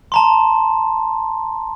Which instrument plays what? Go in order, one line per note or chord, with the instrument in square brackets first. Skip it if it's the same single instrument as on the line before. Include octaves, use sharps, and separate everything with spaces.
[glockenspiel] A5 A#5 C6